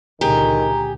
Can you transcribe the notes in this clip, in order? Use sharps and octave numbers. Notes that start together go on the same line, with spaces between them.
C#2 A#2 D3 D#3 G4 G#4 A#5